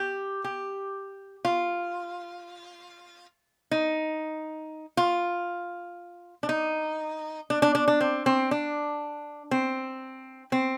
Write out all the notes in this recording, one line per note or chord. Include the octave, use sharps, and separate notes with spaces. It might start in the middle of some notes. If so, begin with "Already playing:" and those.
Already playing: G4
G4
F4
D#4
F4
D4
D#4
D4
D4
D4
D4
C4
C4
D4
C4
C4